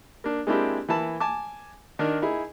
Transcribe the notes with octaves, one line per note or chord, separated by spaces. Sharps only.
A#3 D4
G#3 A#3 C4 D4 E4 G4
E3 A#3 E4 A5 B5
G#5 A5 D6
D#3 D4 A#4
D#4 E4 G#4